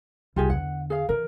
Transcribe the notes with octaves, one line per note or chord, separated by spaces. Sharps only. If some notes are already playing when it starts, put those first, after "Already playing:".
C2 F4 G4 G#4
E2 D3 F#5
G#4 F5
E3 A#4